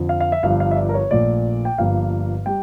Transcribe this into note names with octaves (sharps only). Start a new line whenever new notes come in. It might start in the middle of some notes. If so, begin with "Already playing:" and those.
Already playing: F2 D3 F3
F5
F5
E5
G1 G2 F3 F5
F5
E5
D5
A#4
C#5
A#1 A#2 A3 D5
G5
G1 G2 F3 A#3 F5
G3 G5